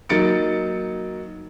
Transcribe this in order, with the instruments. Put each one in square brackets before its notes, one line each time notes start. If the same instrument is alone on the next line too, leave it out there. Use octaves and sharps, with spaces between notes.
[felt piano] F#3 A#3 D#4 A6 C#7 D7